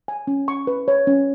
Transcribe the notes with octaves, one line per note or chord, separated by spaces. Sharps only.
G#5
C#4
C#6
B4
C#5
C#4